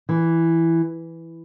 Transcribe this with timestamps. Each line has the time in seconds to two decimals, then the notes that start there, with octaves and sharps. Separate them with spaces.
0.09 E3